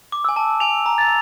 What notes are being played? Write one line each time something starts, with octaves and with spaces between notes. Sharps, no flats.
D6
G#5 E6
A5
G#5 F7
A#5
A6